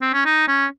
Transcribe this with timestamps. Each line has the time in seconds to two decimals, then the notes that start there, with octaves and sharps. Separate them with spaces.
0.02 C4
0.14 C#4
0.26 D#4
0.48 C#4